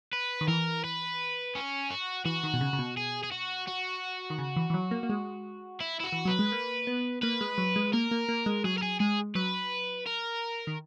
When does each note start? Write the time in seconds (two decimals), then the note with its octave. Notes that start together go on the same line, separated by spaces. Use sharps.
0.13 B4
0.41 D#3
0.48 E3 A#4
0.84 B4
1.55 C#4
1.91 F#4
2.25 E3 F#4
2.44 D#3
2.54 B2
2.61 C#3
2.73 C#3
2.79 B2
2.97 G#4
3.23 G#4
3.32 F#4
3.68 F#4
4.30 D#3
4.38 C#3
4.56 E3
4.70 E3
4.74 F#3
4.91 A#3
5.03 A#3
5.09 G#3
5.81 E4
6.00 E4
6.04 F#4
6.12 E3
6.25 F#3 B4
6.39 G#3
6.52 A#3
6.87 B3
7.22 A#3 B4
7.41 G#3
7.58 F#3
7.76 G#3
7.93 A#3 A#4
8.11 A#3
8.29 A#3
8.46 G#3
8.64 F#3 G#4
8.78 A#4
8.82 G#4
9.00 G#3 G#4
9.35 F#3 B4
10.06 A#4
10.67 D#3